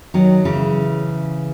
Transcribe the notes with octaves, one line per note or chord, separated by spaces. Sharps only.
D#3 F#3
C#3 E3